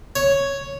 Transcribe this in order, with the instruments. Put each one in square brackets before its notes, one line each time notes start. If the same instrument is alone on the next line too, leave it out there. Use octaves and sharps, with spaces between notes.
[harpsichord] C#5